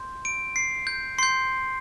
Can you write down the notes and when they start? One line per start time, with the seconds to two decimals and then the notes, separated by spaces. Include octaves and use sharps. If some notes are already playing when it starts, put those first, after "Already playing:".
Already playing: C6 G6
0.25 D7
0.56 C7
0.87 G6
1.19 C6 G6 C7